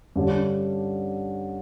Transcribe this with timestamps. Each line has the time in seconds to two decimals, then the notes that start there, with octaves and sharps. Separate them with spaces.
0.16 G2 D3 G3 C#4